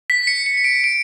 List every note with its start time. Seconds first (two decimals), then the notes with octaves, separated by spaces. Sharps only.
0.10 B6
0.27 C#7
0.46 C#7
0.57 C#7
0.64 D7
0.84 D7